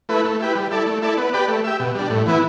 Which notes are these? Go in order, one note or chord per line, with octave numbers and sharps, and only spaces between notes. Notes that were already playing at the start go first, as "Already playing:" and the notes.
A3 E4 B4
A3
E4 G4 B4
G3
E4 A4 D5
A3
E4 A4 D5
B3
G4 B4 D5
A3
G4 E5
B2
G3 D4
A2
E3 B3 E4